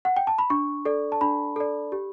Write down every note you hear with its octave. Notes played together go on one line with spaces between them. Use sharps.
F#5
G5
A5
B5
D4 C#6
A4 D5
A5
D4 B5
A4 D5
G4